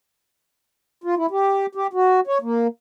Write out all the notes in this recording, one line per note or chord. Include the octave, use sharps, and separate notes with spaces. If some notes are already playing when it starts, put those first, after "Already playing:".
F4
E4
G4
G4
F#4
C#5
A#3